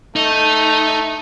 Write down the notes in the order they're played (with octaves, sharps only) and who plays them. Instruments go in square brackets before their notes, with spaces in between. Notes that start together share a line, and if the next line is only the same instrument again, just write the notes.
[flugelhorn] A3 [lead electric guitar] D#4